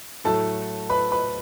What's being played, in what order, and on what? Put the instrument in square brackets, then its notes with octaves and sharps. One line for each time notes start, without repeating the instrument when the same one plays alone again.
[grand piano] A2 F#3 A3 A4 A5
B4 B5
B4 B5